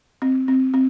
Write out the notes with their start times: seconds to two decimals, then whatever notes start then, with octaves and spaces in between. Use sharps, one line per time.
0.22 C4
0.48 C4
0.74 C4